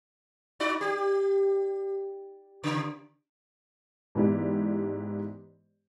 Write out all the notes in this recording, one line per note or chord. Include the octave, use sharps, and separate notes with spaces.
D#4 F#4 D5
G4
C#3
G#2 E3 B3 E4 G4 D5